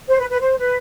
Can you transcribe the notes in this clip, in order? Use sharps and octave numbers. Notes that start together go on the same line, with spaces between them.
C5
B4
B4
C5
B4